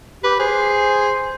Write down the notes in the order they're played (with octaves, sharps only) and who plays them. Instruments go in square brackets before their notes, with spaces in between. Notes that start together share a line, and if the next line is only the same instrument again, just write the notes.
[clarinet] G4 [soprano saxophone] B4
[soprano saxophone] G#4 [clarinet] C5